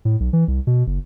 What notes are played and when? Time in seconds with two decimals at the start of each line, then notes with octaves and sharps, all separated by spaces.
0.05 A2
0.20 B1
0.33 E3
0.48 C2
0.67 B2
0.87 F#1